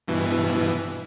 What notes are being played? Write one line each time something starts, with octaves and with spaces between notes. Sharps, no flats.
G2 B2 E3